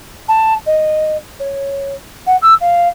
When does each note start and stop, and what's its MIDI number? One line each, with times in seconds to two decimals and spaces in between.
0.29 0.54 81
0.66 1.17 75
1.40 1.94 73
2.27 2.37 78
2.42 2.54 88
2.61 2.88 77